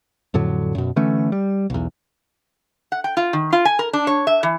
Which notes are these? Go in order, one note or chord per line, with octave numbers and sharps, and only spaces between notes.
F2 A2 D3 F#3
F#2 B2
D3 E3 A3 C#4
G3
B1 E2
F#5
G5
F4
D#3
F4
G#5
A#4
D4
C#5
E5
E3